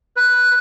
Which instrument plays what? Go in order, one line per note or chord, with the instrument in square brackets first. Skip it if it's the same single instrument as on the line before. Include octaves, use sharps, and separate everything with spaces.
[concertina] B4